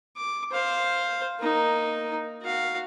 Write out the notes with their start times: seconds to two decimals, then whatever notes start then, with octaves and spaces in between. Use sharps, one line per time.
0.17 D6
0.52 C5 F5
1.40 A#3 D#4
2.42 F#4 F5